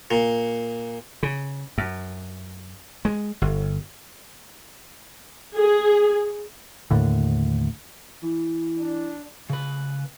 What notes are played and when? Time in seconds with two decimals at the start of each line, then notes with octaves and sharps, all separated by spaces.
0.11 A#2
1.23 C#3
1.78 F#2
3.05 G#3
3.42 G1
5.55 G#4
6.91 D#2 A2 D3
8.23 E3
8.79 D4
9.50 C#3 B4